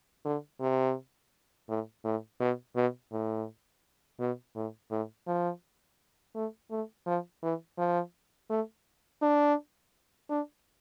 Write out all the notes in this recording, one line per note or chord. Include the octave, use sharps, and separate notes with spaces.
D3
C3
A2
A2
B2
B2
A2
B2
A2
A2
F3
A3
A3
F3
E3
F3
A3
D4
D4